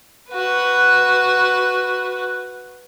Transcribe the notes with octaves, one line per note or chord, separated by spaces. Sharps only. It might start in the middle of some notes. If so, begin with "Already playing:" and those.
F#4 B4